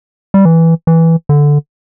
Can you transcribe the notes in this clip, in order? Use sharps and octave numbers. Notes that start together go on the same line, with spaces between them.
G3
E3
E3
D3